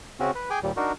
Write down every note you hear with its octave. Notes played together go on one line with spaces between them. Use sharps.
C#3 C4 C#4 F#4
B4
G#4 G5 G#5 D6
D#2 A#2 G3
D4 D#4 F#4 A#4